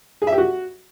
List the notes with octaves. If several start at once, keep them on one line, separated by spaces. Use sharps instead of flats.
G#4
E5
G4
F#4